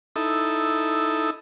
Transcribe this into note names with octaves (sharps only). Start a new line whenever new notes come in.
D#4 E4 A4